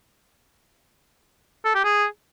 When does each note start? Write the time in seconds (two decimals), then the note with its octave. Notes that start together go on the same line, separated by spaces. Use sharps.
1.65 A4
1.75 G4
1.85 G#4